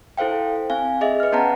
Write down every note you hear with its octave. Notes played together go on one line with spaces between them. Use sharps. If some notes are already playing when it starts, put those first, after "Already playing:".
E4 A4 C5 F5 G5
C4 F5 G#5
G#4 D#5 E5
B4 F6
B3 C#4 B4 F#5 A5 A#5